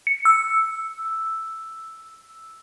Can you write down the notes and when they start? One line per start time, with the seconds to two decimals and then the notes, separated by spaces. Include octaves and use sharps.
0.07 C#7
0.25 E6